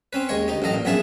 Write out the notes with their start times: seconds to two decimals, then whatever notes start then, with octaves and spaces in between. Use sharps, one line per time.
0.13 C4 C#4 B4
0.29 D#2 G#3 C#5 C#6
0.48 D2 D#4 G4
0.62 A1 F#2 A4 D#5 A#5
0.74 A#2
0.85 A#1 F#2 B3 G#4 E5 A5